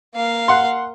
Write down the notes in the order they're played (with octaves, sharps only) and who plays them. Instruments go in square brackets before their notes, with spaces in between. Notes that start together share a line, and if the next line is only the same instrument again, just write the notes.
[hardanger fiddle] A#3 F5
[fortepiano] F#5 C6